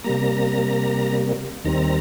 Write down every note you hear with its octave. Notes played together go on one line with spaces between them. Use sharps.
C3 G3 A#3 A#5
D#2 D#3 G3 C4 A#5